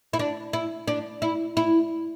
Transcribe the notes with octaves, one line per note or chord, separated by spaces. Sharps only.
E4
D4
E4
D4
E4
E4